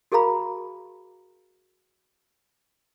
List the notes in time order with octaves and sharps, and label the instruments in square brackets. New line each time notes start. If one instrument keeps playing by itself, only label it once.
[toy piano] F#4 G#4 A#4 F5 A#5 B5